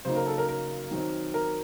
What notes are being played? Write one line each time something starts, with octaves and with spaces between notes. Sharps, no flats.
C#3 F#3 A#3 D#4 C5
A#4
A4
A#4
A#4
D#3 F#3 C4 D#4
A#4